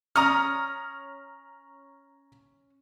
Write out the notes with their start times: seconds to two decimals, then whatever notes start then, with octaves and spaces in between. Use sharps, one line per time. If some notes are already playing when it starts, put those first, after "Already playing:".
0.16 C#4 A#5 D#6 F6